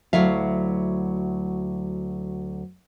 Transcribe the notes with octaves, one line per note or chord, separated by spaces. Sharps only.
D2 F#3 E4 E5 F5